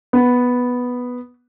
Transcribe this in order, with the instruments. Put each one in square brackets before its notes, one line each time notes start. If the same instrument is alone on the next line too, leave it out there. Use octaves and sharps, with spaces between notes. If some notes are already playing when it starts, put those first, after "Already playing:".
[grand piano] B3